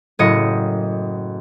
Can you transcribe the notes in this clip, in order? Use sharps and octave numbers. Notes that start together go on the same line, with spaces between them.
F#1 A2 D#5 C#7